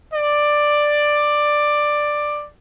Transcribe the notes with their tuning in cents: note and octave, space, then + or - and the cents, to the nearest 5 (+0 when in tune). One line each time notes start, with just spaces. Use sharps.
D5 +10